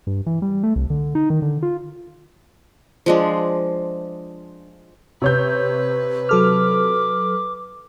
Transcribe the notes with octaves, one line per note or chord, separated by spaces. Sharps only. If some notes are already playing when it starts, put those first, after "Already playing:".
G2
E3
G3
A3
C2
D3
D#4
D#3
D3
F4
F3 G#3 D4
C3 B4 C#5 G6
F#3 A4 D6 F6